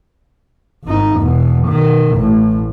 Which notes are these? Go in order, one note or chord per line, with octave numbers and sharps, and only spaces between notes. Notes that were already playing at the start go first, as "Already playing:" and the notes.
G#1 D#4
E2 B2
B2 D#3
A1 A2